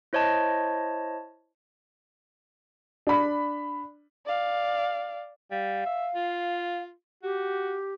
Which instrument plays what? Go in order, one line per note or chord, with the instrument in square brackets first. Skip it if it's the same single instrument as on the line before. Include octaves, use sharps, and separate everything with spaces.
[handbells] E4 C5 C#5 D#5 A5
[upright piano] D4 B5
[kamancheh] D5 F5
[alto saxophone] G3 [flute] F5
[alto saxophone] E5
F4
[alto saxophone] F#4 [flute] G4